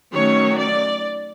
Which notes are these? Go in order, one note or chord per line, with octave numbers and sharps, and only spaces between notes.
D#3 F#3 A3 C#4 C#5
D5